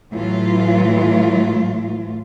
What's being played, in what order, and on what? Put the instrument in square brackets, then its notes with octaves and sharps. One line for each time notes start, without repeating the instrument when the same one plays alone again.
[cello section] A2 E3 F#3 A3 F4